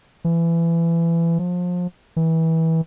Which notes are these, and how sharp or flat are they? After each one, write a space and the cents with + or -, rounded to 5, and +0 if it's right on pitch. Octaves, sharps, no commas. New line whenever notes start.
E3 +25
F3 +30
E3 -25